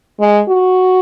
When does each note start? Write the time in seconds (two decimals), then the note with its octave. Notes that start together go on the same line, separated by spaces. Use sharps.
0.20 G#3
0.49 F#4